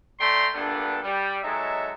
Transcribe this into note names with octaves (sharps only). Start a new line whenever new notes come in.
A3 D5 G5 A#5 C6
G2 A#2 A3 B3 D4 A4
G3
F#3 G#3 D#4 A4 C#5 E5